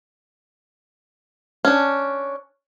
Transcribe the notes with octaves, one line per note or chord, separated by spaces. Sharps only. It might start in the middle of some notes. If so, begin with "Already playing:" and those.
C#4 D4